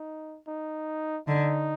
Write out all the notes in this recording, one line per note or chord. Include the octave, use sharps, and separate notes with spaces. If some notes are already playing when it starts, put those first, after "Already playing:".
Already playing: D#4
D#4
D3 D#4